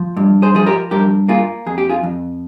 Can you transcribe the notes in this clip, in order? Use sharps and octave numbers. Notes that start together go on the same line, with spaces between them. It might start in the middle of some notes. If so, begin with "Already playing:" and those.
Already playing: F3
G2
G#4 C5
F3 G#4
G4 A#4
G2 G4 A#4
A#3 F4 G#4
F2 G#4
G4
F4 G#4
F2